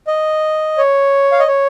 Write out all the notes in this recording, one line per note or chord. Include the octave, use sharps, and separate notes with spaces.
D#5
C#5
F5
D#5
C#5